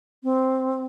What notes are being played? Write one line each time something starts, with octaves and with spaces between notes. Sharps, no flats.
C4